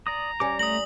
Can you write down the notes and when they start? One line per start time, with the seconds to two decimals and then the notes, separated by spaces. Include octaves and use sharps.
0.07 D5 A#5 D#6
0.40 G3 C#4 D6
0.59 A3 A#5 D#6 F#7